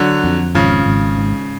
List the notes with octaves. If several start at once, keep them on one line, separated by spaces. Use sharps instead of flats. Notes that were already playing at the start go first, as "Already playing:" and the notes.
Already playing: D3 F#3
F2
G#1 C#3 F3
G#1
G#2